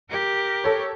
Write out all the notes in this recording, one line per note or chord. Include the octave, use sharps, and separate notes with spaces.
G4 A#4
A4 C#5